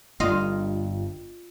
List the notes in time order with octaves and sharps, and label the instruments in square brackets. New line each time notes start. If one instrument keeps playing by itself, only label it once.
[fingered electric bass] G1 G2 [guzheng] F4 D#5 F5